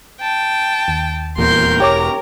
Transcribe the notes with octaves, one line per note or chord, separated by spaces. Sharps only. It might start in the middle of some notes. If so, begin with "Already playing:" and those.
G5 A5
D#2
D#1 E2 A#2 A#4 C6 G6
E1 G4 C#5 A#5 D6